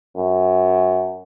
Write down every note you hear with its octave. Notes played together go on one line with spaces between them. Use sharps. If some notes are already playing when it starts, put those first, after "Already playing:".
F#2